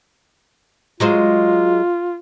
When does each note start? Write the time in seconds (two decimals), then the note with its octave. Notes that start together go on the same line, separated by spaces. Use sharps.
1.00 F#3 G#3 F4 C5